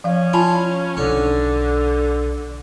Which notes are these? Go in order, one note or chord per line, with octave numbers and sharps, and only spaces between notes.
F3 C#4 F5
F4 G#5 A5 B5
B1 D3 C#4